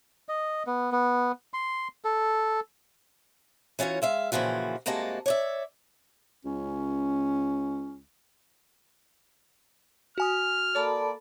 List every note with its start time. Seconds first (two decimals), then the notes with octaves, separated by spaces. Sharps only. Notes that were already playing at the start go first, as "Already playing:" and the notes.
0.29 D#5
0.67 B3
0.92 B3
1.54 C6
2.04 A4
3.79 E3 C#4 F4 F#4 C#5
4.02 G#3 E5 F5
4.32 A#2 C#3 E3 F3 F#4
4.86 G2 C3 G#3 A#3 F#4 A5
5.26 C#5 D5 E5
6.45 C#2 C#4
10.18 F#4 G#5 D#6 F6
10.75 A#3 A4 D5 A5 B5